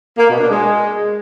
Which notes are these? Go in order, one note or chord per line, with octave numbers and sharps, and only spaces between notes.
A#3
B2
D4
G#3